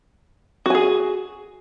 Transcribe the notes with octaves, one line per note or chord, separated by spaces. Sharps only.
F#4 G#4 G#5